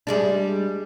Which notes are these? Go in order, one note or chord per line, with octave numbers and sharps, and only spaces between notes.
G3 G#3 D4